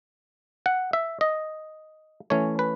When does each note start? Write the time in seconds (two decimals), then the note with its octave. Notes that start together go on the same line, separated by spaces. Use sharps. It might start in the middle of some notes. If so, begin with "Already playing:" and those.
0.66 F#5
0.93 E5
1.21 D#5
2.30 E3 A3 C#4 C#5
2.59 B4